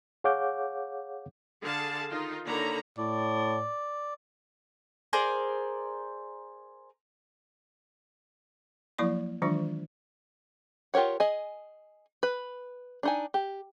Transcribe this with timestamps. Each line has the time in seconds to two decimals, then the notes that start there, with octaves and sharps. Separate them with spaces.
0.24 G#4 C#5 F5 F#5 D6 G6
1.62 D3 G#4 F5 A5
2.10 D#3 D#4 F4
2.46 D3 A#3 D#4 C#5 A#5 B5
2.97 A2 D5
5.13 G#4 A#4 C5 D5
8.98 F3 F#3 A#3 E4 D5 C#6
9.42 D#3 E3 F#3 G#3 D4 F4
10.94 F4 G4 A#4 C#5 F#5
11.20 G#4 D#5 G#5
12.23 B4
13.03 D4 D#4 G#5
13.34 G4